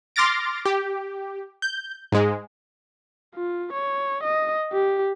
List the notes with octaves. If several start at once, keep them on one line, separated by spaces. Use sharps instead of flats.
C6 D6 F6 A6 A#6 D7
G4
G6
G#2 G#3
F4
C#5
D#5
G4